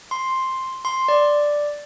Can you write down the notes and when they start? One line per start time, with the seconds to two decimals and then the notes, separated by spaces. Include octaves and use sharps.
0.11 C6
0.85 C6
1.08 D5